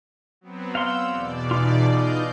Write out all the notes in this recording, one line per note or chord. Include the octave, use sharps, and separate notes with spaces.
F#3 B3 C4
F5 F#5 C6 E6 G6
E2 B2 D5
D#4 F4
D#5 F5 G6